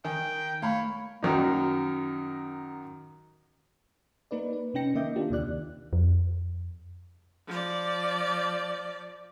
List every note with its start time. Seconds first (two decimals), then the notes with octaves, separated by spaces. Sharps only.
0.05 D#3 G5 G#5
0.62 A3 C#5 F5 B5
1.23 F#2 D#3 D#4
4.31 A#3 D#4 B4 D5
4.53 B4
4.74 C3 C#4 D#4 G5 A#6 C#7
4.95 D#3 A#3 D#5 E5 D6 G6
5.16 A#3 D4 F4 G4
5.30 D#2 C3 D#3 D5 F#6
5.93 F2
7.48 F3 D5